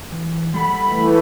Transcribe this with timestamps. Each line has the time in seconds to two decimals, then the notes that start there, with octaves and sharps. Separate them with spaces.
0.12 E3
0.54 G3 A4 F#5 B5
0.89 E3 A3